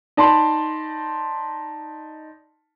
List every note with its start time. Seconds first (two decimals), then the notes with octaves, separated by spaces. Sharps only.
0.17 D#4 D5 A5 B5 C6